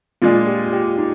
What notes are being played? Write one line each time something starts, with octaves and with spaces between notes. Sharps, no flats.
A#2 G#3 D4 F4
G4
G4
D#4